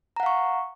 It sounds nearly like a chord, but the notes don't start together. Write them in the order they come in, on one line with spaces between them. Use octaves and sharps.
A#5 F#5 F5 C#6